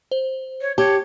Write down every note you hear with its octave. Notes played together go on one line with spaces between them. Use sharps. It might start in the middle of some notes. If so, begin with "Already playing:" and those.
C5
C#5
G4 C#5 A5